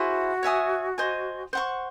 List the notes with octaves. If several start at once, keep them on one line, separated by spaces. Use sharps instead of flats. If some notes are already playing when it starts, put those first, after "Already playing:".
Already playing: E4 F#4 G#4 C5
C#5 E5 G#5 D#6
C5 D#5 G#5
C5 F#5 C#6